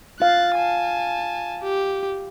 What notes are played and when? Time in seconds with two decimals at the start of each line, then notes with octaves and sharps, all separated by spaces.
0.20 F4 F5 F#6 A6
0.56 G#5 A5
1.63 G4